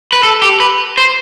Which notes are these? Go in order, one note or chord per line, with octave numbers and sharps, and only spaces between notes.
B4
A4
G4
B4
C5